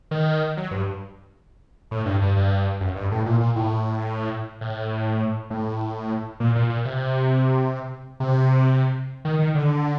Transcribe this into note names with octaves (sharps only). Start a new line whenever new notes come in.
D#3
F#3
G2
A2
G2
G2
G2
F#2
G2
A2
A#2
A#2
A2
A2
A2
A#2
A#2
A#2
C3
C3
D#3
D#3
D3